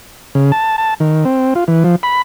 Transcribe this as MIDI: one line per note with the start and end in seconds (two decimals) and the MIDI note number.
0.35 0.52 49
0.52 0.76 81
0.78 0.94 81
1.00 1.25 51
1.25 1.54 60
1.55 1.64 65
1.68 1.84 52
1.84 1.96 53
2.03 2.22 83